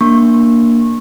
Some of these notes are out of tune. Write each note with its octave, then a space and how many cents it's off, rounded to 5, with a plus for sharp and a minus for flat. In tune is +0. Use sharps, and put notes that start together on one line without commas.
A#3 +0 D4 +0 C#6 -20